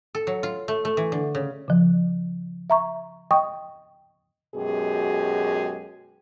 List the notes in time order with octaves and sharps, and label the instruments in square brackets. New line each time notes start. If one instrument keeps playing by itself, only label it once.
[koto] A4
F#3
F4
A3
A3
E3
D3
C#3
[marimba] C#3 F3
E5 A#5 C#6
D#5 G5 C#6 D#6
[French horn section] F#2 B2 G#3 G4 G#4